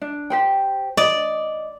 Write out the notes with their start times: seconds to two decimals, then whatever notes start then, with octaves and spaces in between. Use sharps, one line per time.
0.02 D4
0.30 G4 C5 G5
0.97 D5 D#5